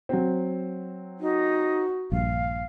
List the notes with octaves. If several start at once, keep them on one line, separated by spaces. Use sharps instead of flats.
F#3 C4
D#4 F#4
A#1 G2 F5